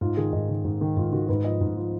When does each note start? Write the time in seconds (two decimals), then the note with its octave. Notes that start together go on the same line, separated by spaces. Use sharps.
0.01 G#2 F4
0.17 D#3 G#4
0.33 G#2 D#5
0.49 D#3
0.65 G#2
0.81 D#3
0.97 G#2 F4
1.12 D#3 F#4
1.28 G#2 B4
1.45 F3 D#5
1.61 G#2
1.76 F3